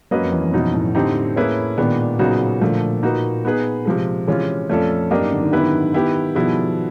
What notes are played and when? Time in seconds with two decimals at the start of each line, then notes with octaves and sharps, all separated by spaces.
0.11 F#2 A#3 C#4 F#4 B4 D#5
0.22 F2
0.32 E2
0.43 F2
0.53 F#2 B2 F#3 B3 D#4
0.73 A2
0.95 D3 G3 C4 D#4 G4
1.36 A#3 C#4 E4 G#4 B4
1.77 A#2 D#3 G#3 B3 D4
2.19 C#3 F#3 B3 D#4 F#4
2.61 A#2 D3 F3 A3
3.03 A#3 D#4 F#4 B4
3.45 B3 D#4 G#4 B4
3.85 C3 F3 G#3
4.27 C3 E3 G#3 C#4 F4
4.69 F2 A3 C#4 F4 A4 D5
5.11 F#2 A#3 D4 G4 A#4 D#5
5.21 G#2
5.32 D3
5.42 D#3
5.52 D#3 B3 E4 G4 B4
5.94 B3 E4 G4 B4
6.35 B2 F3 G3 B3 E4 G#4